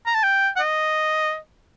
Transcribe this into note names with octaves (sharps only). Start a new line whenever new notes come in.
A#5
A5
G5
F#5
D#5